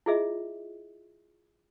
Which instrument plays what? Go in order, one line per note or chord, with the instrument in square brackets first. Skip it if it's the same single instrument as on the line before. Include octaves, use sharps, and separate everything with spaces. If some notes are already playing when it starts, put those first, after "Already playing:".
[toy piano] E4 F4 G#4 D#5 E5